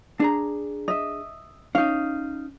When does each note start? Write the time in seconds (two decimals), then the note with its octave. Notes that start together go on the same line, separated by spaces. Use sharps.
0.20 D4 G#4 A#5
0.88 D#5 E5
1.75 C#4 D#4 F5